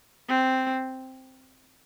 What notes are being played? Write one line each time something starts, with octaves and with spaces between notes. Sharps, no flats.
C4